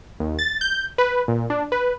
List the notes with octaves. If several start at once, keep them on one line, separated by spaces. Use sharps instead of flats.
D#2
A6
G6
B4
A#2
D4
B4